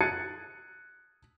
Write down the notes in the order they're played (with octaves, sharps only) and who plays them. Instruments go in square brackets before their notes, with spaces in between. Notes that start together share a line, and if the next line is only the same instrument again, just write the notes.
[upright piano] F#6 G#6 A6 C7 C#7 D#7